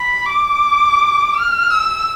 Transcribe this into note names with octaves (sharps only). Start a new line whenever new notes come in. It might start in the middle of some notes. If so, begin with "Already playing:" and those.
Already playing: B5
D6
F6
E6